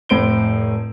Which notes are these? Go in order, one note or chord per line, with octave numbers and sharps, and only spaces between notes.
F1 A2 C5 D7 G7